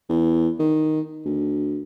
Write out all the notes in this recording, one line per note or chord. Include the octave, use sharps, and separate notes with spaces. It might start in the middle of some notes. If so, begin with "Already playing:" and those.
E2
D#3
D2